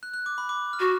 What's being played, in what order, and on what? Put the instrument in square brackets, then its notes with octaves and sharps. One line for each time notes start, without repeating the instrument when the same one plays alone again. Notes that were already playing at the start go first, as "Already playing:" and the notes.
[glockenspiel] F#6
F#6
D6
B5
D6
F6
[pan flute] F#4